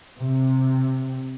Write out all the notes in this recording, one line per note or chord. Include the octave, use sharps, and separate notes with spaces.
C3